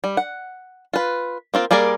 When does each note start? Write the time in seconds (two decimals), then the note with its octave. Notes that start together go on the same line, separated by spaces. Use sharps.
0.04 G3
0.17 F#5
0.93 F4 B4
1.54 A#3 C4 F4
1.71 G3 A#3 G#4 A#4 D5